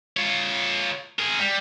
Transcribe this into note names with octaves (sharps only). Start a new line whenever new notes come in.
F4 C#5
G#4 A#4
G3